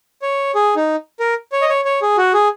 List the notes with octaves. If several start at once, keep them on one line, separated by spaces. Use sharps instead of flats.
C#5
G#4
D#4
A#4
C#5
D#5
C#5
C#5
G#4
F#4
G#4